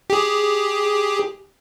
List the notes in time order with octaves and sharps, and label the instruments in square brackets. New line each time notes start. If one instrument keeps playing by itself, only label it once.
[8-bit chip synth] G4 G#4